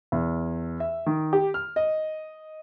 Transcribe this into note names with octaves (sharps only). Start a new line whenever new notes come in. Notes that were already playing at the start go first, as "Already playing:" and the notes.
E2
E5
D#3
G4
F6
D#5